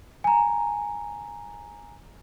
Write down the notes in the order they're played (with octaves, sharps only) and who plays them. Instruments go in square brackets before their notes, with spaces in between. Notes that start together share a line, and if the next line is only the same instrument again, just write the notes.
[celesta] G#5 A#5